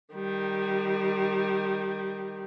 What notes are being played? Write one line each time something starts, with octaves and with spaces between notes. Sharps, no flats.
D#3 G3